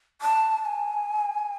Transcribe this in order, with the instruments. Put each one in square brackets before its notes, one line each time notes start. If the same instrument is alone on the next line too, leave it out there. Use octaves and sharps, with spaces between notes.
[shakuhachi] A5
A5
G#5